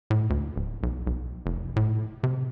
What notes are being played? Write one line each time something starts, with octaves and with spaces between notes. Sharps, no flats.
A2
D2
D1
B1
B1
F1
A2
C3